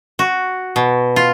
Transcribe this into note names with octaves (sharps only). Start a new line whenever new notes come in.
F#4
B2
F4